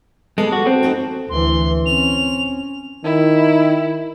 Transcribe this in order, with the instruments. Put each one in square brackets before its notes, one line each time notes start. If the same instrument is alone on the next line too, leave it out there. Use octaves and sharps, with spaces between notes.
[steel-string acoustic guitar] G3 B3 A4 [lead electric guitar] G#3
[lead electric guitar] F#4
C4
[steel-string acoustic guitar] D#4 F#4 A4
[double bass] D2 E3 [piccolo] C6
[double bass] C4 C#4 [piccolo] F7
[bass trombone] D#3 [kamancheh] E4